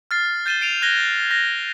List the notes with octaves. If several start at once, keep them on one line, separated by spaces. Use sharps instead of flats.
F6 A6 C7
G6 A6 D#7 E7 G7
C7 D7 D#7 F7
F#6 G#6 A#6 G7
F#6 A#6